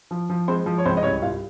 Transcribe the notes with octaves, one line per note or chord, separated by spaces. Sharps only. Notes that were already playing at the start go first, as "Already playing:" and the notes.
F3
F3
G#3 C4 C5
F3
C#5
C#2 C4 C5
D#5
C2 C#4 C#5
C2 F4 F5